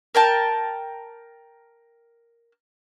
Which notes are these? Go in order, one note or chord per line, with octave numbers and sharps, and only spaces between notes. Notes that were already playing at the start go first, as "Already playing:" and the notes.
A#4 G5 A5